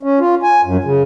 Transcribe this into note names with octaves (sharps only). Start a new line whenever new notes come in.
C#4
F4
G#5
F#2
C#3